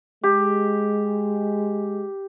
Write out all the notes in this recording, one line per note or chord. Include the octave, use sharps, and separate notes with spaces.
G#3 G4